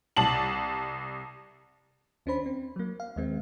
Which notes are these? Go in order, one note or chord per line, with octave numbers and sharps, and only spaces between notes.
C2 A5 F#7
D#2 C#4 D4 C5 B5
C4
F#3 A#3
F5
D#2 G#3 C4